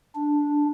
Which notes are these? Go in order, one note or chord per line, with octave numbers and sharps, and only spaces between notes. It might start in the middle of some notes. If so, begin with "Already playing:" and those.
D4